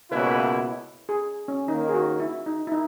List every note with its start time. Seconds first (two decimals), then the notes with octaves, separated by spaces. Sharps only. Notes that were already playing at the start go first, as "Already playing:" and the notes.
0.11 C#2 B2 A#3 E4 B4
0.19 C#5
0.27 B4
1.09 G#4
1.48 C#4
1.68 D#2 D#3 A#3 D#4
1.89 G#4
1.94 F#4
2.20 E4
2.46 D#4
2.67 E4
2.72 D#4